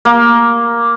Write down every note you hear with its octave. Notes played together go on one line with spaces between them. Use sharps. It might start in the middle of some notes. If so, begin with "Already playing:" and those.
A#3